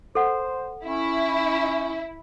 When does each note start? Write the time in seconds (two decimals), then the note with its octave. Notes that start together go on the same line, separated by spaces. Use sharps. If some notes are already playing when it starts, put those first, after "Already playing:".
0.15 A4 C5 F#5
0.85 C#4 E4